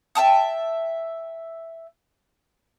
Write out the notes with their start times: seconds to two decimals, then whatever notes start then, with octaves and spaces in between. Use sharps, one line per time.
0.15 E5 G5 A5 D#6